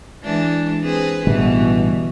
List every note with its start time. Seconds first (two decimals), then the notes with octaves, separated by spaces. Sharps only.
0.23 E3 G#3 D4
0.82 C4 G#4 B4
1.27 A1 B2 D3 E3 G3